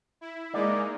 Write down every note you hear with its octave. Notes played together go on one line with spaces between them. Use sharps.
E4
G#3 A#3 D#4 D5